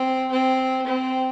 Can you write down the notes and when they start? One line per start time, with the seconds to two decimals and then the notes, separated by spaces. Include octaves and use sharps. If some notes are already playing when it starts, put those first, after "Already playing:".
Already playing: C4
0.32 C4
0.86 C4